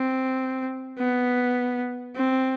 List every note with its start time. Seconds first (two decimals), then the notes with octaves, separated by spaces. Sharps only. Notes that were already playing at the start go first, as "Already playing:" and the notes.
Already playing: C4
0.99 B3
2.16 C4